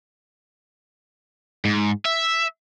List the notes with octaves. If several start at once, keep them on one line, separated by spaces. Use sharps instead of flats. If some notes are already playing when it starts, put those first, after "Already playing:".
G#2
E5